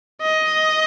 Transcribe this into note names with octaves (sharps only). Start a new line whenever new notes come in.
D#5